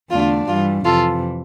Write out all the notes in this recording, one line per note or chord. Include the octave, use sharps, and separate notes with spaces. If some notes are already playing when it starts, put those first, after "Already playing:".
E2 D3 A3 D4 F4
G2 E3 G3 F4
F2 C3 E3 F4 A4